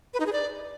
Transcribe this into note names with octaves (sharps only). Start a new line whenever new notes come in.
B4
D#4
G#4
D5